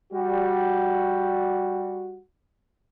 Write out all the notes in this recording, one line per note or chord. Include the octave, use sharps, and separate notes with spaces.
G3 F#4